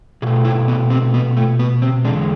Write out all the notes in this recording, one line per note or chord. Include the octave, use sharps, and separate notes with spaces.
B2 A3 G#4
E4
B3
C4
B3
A3
B3
C4
E2 D3 G#3 D4